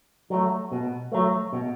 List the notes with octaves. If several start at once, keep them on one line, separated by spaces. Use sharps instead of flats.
F#3 A3
B2
F#3 A3
B2